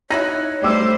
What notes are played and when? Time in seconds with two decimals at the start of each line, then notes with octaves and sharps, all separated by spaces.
0.10 D#4 E4 F#4 C#5 A#6
0.62 G3 A3 C5 D5 D6 E6